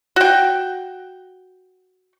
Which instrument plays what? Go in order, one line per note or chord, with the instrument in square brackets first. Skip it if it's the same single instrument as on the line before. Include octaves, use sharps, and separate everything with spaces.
[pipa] F#4 G5